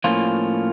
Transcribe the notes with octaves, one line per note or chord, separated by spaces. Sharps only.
A2 F3 A#3 C#4 F4